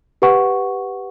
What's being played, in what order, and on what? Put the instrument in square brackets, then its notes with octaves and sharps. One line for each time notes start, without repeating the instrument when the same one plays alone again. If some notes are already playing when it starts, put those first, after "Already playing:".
[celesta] G4 B4 F#5 C#6